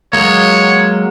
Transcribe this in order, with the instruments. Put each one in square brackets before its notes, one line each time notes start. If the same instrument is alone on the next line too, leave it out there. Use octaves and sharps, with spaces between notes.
[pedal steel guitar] F#3 G#3 A#3 [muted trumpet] C#5